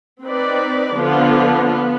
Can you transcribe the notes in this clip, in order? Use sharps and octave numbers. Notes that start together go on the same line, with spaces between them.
C4 D#4 B4 D5
D3 F3 B3 F4
B3